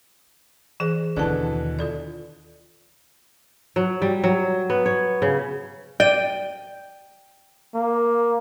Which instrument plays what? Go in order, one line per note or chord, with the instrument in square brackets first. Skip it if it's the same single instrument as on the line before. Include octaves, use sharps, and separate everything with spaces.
[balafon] E3 G#4 C5 [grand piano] E7
[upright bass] D#2 [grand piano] B2 D3 E3 [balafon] D5 A5
[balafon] F4 A4 D5
[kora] F#3
G3
F#3
B3
C#5
C#3
[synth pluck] D5 D#7 [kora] G5
[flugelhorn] A#3